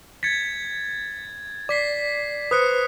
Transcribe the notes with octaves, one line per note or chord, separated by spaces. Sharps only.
G#6 A6 B6 C#7
D5 D6 B6 C7
B4 C5 D#6 F#6 C#7